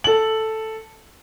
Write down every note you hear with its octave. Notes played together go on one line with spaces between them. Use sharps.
A4 F#7